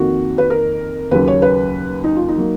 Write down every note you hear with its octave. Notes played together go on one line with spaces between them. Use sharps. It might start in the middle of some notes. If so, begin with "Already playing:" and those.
Already playing: F2 D#3 A#3 F#4
B4
A#4
D#2 C#3 F#3 A#3 B4
C#5
B4
D#4
F4
D#4
F#3 A#3